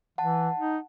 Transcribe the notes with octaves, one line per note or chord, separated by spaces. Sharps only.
E3 F#5 A5
D#4